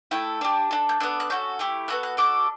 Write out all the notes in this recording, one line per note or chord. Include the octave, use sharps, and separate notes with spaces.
A3 E4 A4 G5
D4 G4 A5
D4 A4
G6
B3 D4 A4 F#6
F#6
C#4 F#4 A4 G6
A3 E4 G4
B3 F#4 A4 F#6
F#6
D4 F#4 A4 D6